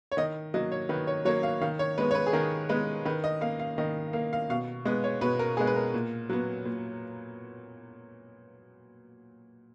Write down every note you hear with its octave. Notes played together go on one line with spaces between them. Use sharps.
C#5
D#3 D#5
F#3 A#3 D#5
C#5
D#3 B4
C#5
F#3 A#3 C#5
F5
D#3 F5
C#5
G#3 B3 B4
C#5
B4
G#4
D#3 A#4
G#3 B3 B4
D#3 B4
D#5
A#3 F5
F5
D#3 D#5
A#3 F5
F5
B2 F5
G#3 B3
C#5
B2 B4
A#4
G#3 B3 G#4
B4
A#4
A#2
F#3 B3
A#2